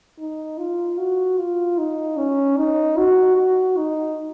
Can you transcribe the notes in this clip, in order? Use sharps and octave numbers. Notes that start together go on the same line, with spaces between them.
D#4
F4
F#4
F4
D#4
C#4
D#4
F#4
F#4
D#4